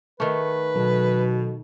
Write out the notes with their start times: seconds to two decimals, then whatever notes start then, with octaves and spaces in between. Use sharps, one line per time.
0.20 D#3 A3 B4
0.76 B2 F#3 A4